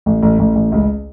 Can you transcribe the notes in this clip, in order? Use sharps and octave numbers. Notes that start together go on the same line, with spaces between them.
A1
A1
A1
A1
C#2